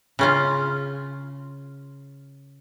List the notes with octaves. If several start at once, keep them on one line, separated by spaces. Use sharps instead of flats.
C#3 C#4 F4